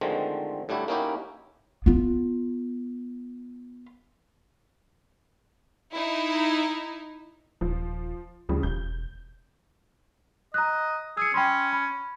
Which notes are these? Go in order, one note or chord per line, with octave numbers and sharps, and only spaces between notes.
D3 D#3 F3 G#3 A3 C4
A2 G3 D4 E4 F#4
A#3 C#4 D#4 E4 F#4 G4
B3 F4
D#4 E4
D#1 F3
D2 C#3 F3 G3
E1 G6
D#5 A#5 F#6
G#4 E6 C#7
C#4 G5 B5 C6
B5